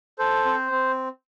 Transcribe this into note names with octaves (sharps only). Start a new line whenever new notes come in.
A4 C5
C4
C4